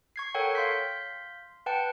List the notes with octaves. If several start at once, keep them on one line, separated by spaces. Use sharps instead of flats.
C#6 G#6 C7
A4 A#4 C#5 F#5 G5
F5 C6 G6 B6
B4 F#5 G5 A5